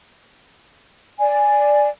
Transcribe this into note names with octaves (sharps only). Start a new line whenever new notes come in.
D5 G#5